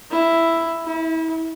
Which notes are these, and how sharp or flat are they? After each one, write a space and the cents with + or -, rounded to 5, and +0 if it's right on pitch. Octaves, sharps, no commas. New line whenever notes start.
E4 +5
E4 -35